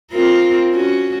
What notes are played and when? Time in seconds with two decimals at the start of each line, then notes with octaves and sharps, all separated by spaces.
0.12 C4 F4 A#4
0.70 C#4 F#4